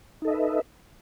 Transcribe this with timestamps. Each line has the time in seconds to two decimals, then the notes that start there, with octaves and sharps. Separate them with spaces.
0.22 D#4
0.25 A4
0.28 D#5
0.30 E5
0.33 B4